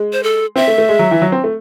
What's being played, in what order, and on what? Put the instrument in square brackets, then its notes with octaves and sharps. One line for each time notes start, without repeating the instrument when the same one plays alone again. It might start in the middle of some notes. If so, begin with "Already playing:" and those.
Already playing: [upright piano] G#3
[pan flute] C5
A4
[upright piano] C4 [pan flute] E5
[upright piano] A3
A3
G#3
F#3
E3
F#3
C4
A3